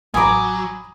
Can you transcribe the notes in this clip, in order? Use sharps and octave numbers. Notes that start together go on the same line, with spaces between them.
A1 F#3 G#5 A#5 B5 D6 D#6